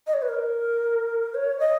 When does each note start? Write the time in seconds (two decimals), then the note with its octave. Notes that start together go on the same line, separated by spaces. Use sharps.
0.07 D#5
0.14 C#5
0.22 B4
0.29 A#4
1.34 C#5
1.60 D#5